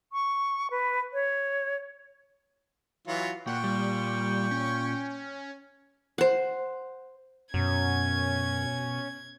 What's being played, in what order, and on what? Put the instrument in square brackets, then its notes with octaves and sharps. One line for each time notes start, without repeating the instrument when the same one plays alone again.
[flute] C#6
B4
C#5
[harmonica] E3 F#3 F4
[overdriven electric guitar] A#2 [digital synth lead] F#5 [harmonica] G5 C#6
[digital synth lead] G3
C#4
[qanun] C5 F#5
[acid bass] F#2 [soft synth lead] B2 [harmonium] C#4 [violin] G#6